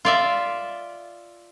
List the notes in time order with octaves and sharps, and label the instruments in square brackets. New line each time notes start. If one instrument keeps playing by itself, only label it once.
[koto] F4 D5 E5